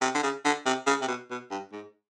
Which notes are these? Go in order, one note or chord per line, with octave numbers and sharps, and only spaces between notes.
C3
D3
C#3
D3
C3
C#3
C3
B2
B2
G2
G#2